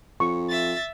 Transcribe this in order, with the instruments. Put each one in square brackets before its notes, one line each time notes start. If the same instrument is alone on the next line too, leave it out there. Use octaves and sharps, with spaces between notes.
[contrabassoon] F2 [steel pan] C#6
[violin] E5 A6